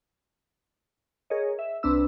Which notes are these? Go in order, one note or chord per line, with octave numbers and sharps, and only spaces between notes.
G#4 A#4 C#5 D#5
E5
C2 C4 D4 B4 E6